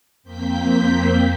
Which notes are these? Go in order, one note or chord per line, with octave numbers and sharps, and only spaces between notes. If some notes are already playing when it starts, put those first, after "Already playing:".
F2 A#3 C4 G6 B6